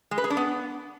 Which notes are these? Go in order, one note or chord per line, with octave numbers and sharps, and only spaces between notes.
G#3
B4
G#4
D4
B3